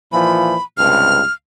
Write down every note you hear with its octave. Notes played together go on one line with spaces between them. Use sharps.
A#2 E3 F3 B5
C#2 G2 C3 F6